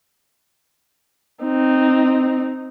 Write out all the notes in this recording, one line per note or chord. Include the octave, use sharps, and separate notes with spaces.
C4 D#4